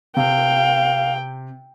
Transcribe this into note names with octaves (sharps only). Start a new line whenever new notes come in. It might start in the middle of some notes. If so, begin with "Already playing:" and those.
C3 F5 G5